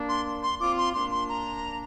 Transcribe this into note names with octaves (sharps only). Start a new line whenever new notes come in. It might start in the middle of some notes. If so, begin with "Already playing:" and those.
Already playing: A#3 D4
C6
C6
C4 F4 D6
C6
A#3 D4 C6
C6
A#5